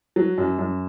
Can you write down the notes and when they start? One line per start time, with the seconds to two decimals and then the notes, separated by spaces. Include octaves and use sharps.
0.16 F#3
0.38 F#2
0.58 F#2